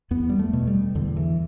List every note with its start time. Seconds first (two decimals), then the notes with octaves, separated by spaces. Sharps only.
0.11 E2 B3
0.29 G3
0.39 A3
0.53 B2
0.67 G3
0.95 E2 D3
1.16 E3